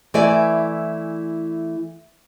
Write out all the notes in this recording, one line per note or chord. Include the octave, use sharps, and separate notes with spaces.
E3 A3 E4 D5 G#5